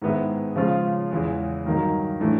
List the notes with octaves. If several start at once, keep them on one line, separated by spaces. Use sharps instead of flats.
G#2 D#3 G#3 B3 E4
C#3 F3 G#3 C#4 F4
E2 C#3 E3 G#3
G2 D#3 F#3 A#3 D#4
A2 E3 A3 D4